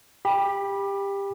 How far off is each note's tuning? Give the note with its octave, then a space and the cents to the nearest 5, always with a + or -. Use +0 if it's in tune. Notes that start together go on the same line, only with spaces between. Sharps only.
G4 +20 B5 -15